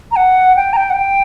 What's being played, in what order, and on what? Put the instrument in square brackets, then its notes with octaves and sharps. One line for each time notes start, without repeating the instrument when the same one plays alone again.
[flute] A#5
F#5
G5
A#5
G5
F#5
G5